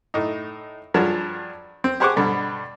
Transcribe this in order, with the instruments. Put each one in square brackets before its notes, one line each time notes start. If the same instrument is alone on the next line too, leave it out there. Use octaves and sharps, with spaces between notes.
[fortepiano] A2 D#4
G2 F3 F#3 G#4 A5
C4
G4 G#4 C5 F#5 C#6 D6
G2 B2 D3